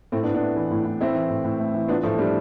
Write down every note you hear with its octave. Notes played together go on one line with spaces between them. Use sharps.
A2 A3 C4
B3 D4
A2
B3 D4
A3
E3
A2
A2
A3 C4 E4
E3
A2
A2
A3
E3
B3 D4 F4
A2 F3 A3
G3 D4